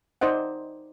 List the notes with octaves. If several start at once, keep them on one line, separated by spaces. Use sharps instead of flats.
D#4 C5 D5 D#5 F#5